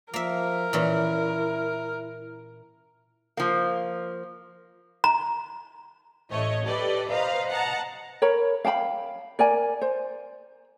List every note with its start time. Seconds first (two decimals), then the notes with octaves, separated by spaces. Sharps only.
0.14 F3 A#3 A#4 E5
0.73 A#2 E3 C#4 E4
3.37 F3 A#3
5.04 A#5
6.31 A1 A3 C#5 D#5
6.65 G4 A4 B4 D5 D#5
7.10 B4 C5 D#5 F5 A#5
7.51 D#5 F#5 A5 A#5
8.22 A#4 C#5 B5
8.65 F5 G5 A5 B5
9.39 A#4 D5 G#5
9.82 C5